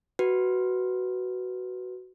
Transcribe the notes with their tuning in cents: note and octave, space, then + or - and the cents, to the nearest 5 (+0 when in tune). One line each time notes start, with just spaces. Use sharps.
F#4 +10 B4 +0